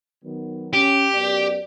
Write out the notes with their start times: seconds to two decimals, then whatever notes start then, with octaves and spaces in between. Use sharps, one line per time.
0.24 D#3 F#3 B3
0.73 C#4 G4
1.14 F#2 B3 D5